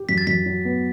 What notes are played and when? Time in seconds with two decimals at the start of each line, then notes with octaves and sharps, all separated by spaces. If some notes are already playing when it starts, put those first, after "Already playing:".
Already playing: G4
0.09 F#2 B6
0.18 A6
0.27 F#2 B6
0.46 F#3
0.65 B3